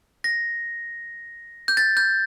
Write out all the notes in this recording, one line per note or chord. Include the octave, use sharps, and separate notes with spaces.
A#6
G6
A6
G6